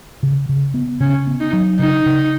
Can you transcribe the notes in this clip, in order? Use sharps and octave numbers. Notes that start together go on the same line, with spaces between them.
C#3
C#3
B3
C#3 C#4
B3
D#4
F#3
C#3 D#4
C#3